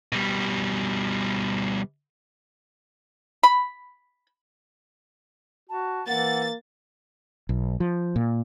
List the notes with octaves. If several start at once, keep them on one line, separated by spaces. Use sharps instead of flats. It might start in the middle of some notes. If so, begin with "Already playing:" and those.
B2 G3
B5
F#4 A5
E3 A#3 F#5 A6
B1
F3
A#2